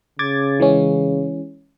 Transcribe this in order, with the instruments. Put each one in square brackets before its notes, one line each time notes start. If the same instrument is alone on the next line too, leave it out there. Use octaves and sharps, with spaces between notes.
[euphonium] C#3 [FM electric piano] D6 G#6 A6
[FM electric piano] E3 G#3 C#4